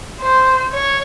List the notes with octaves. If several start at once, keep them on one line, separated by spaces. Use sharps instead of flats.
C5
C#5